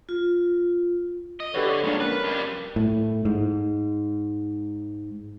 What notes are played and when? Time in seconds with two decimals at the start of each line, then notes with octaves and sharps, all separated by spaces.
0.09 F4
1.40 D#5
1.54 D3 G4 A4 B4 C#5
1.69 C#5
1.84 F2 A#2 G#3 A#3 D4
2.00 C#4 A#4 B4
2.24 F2 G3
2.76 A2
3.25 G#2